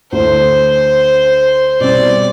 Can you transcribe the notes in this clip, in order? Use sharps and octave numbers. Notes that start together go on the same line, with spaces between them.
D2 D3 A3 D4 C5
B2 G3 C4 D5